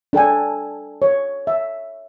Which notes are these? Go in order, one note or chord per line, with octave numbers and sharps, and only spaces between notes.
D4 A4 G5 G#5
C#5
E5